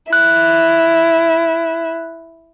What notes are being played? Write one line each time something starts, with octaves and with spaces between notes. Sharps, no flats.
E4 F#6